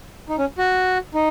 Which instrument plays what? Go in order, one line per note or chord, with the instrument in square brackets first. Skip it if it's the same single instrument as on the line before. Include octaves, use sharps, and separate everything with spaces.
[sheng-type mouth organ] D#4
C#4
F#4
D#4